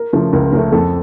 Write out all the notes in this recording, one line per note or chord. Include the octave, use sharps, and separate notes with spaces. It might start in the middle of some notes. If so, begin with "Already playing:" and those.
Already playing: A#4
C#3 F3 A3
C#2 A#4
C#3 F3 A3 A#4
F2 A4